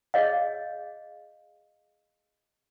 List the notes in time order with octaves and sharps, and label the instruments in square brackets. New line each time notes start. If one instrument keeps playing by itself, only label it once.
[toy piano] G#4 C#5 D#5 F5